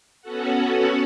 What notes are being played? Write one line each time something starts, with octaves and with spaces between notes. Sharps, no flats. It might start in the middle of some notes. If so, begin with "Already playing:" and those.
B3 C#4 F#4 A4 F#5